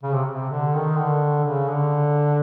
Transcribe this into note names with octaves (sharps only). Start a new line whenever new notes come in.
C#3
C3
C3
D3
D#3
D3
C#3
D3